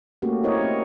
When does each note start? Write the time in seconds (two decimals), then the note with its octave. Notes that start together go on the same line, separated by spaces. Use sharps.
0.22 A3 A#3 C#4 F#4 G4
0.43 C4 E4 G4 A#4 C#5 D#5
0.61 C#4